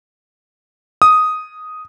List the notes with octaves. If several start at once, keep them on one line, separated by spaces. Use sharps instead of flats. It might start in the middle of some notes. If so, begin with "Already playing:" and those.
D#6